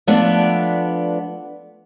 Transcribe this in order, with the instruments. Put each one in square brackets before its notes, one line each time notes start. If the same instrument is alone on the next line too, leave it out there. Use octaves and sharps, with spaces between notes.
[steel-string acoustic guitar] F3 A3 B3 D4 D5